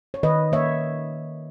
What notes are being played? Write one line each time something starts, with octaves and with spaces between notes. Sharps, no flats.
C#5
D#3 B4 D#5
A#3 C#5 E5